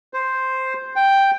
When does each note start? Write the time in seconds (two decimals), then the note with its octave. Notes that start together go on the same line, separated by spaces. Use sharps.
0.14 C5
0.96 G5